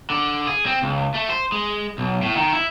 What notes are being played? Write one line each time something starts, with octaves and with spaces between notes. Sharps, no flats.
D3
G#4
C4
C#2
A3
C5
G#3
B1
A2
D#3
E4